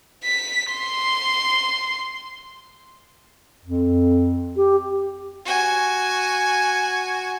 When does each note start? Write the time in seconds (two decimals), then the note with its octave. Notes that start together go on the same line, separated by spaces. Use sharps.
0.25 B6
0.74 C6
3.63 F2
4.56 G4
5.45 F#4 G#5